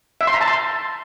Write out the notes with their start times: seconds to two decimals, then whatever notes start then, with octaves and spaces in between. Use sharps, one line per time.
0.21 E5
0.27 C6
0.34 A#5
0.41 A5
0.48 C6